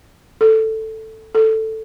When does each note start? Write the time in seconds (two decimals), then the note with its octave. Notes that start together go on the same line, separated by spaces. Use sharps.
0.41 A4
1.35 A4